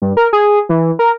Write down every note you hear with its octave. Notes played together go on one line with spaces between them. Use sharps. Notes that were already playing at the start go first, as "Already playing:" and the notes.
G2
A#4
G#4
E3
A#4